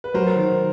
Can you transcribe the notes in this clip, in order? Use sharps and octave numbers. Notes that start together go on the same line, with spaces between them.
B4
F#3 A#4 C5
D#3